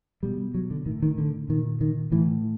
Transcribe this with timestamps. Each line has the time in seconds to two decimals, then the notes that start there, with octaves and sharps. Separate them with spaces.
0.23 B2 G3
0.55 F#3
0.71 D3
0.86 A2 D#3
1.02 D#3
1.18 D3
1.49 A#2 D#3
1.81 D#3
2.12 A2 E3